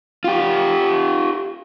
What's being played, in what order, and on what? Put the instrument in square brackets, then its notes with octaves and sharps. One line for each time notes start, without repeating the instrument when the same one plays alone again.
[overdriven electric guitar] F4 G4